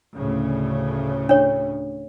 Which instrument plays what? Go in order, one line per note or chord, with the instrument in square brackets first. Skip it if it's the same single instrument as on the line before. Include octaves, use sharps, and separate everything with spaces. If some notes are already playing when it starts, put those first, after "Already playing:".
[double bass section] D2 A2 C#3
[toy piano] D4 C#5